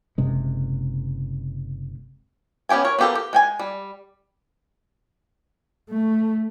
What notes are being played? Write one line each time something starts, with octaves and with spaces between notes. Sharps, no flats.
F#1 C3 G#3
B3 C#4 G4 G5 G#5
A#4 C#5
B3 F4 G4 A4 A#4
G4
G#3 G5 G#5
G3
A3